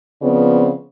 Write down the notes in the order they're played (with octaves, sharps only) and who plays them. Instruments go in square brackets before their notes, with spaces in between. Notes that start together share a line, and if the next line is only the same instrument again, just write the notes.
[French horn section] C#3 F3 B3 C4 F4 D5